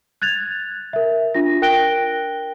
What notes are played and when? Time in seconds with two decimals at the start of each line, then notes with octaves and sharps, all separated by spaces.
0.22 F#6 G#6 A6 F7
0.93 A#4 E5
1.34 D4 F4 A#6
1.62 A#4 G5 F#6 A#6 D7 G7